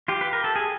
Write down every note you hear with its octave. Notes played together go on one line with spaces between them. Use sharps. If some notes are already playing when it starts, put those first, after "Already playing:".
F4 G4
B4
A#4
A4
G#4